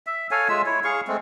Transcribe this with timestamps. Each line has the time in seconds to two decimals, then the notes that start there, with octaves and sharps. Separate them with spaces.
0.07 E5
0.31 A4 C#5 F5 G#5
0.49 G#3 F4 E5 E6
0.66 E4 C#5
0.84 G#4 F5 C#6
1.08 G#3 A3 C4